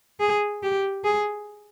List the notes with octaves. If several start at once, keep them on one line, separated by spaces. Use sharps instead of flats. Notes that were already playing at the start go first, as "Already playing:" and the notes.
G#4
G4
G#4